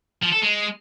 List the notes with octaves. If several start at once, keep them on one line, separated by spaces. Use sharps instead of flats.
F3
A4
G#3